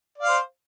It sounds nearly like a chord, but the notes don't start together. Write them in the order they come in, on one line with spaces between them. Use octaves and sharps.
D5 F5 C5